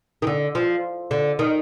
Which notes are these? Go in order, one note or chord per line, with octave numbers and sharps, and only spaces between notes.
D#3
D3
F3
D3
D#3